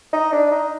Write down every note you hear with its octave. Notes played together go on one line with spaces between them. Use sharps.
D#4
D4
D#4